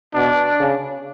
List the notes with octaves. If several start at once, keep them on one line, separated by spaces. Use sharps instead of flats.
B2 D4
C#3